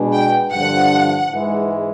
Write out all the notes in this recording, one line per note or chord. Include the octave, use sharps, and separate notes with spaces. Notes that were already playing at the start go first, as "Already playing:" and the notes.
Already playing: B2 G#3 B3 D4
G5
G2 D3 F3 F#5
G#2 E3 G#3